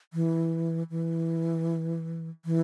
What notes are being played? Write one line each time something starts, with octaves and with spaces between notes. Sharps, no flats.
E3
E3
E3